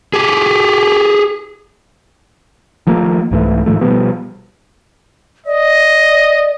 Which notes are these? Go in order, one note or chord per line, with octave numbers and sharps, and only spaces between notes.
G4 G#4
D#3 F3 A3 A#3
C2 G#2 E3 A3
G#2 D#3 F3 A3
B2 F3 G3 B3
D5 D#5